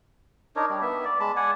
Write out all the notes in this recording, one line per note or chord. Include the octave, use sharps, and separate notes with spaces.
D4 D#4 A#4 C#5
G3 D4
B3 E5
D5
G#3 A5 B5
D5 F#5 G#5